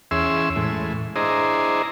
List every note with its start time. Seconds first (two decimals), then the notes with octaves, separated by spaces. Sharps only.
0.11 E2 C#4 G#4 E5 C6 E6
0.56 A2 E3 G#3
1.16 D4 E4 G#4 C5 D#5 A#5